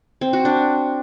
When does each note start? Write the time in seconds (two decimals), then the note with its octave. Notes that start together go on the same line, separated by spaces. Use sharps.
0.21 C4
0.33 F#4
0.45 D4